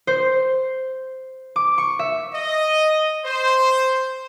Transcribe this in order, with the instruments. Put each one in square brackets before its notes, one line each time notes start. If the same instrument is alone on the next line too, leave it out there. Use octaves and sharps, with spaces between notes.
[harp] C5
D6
C#6
E5
[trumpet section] D#5
C5